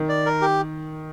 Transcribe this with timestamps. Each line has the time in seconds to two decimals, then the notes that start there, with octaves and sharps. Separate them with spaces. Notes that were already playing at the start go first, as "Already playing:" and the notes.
Already playing: D#3
0.09 D5
0.26 A#4
0.42 G4